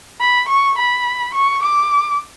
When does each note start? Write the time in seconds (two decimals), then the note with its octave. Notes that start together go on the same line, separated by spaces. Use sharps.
0.20 B5
0.49 C#6
0.78 B5
1.34 C#6
1.63 D6